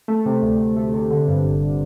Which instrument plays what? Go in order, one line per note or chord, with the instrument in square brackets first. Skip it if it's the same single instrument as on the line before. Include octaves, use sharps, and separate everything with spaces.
[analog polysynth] A3
C3
D2
D2
A3
C3
D3
G2
G1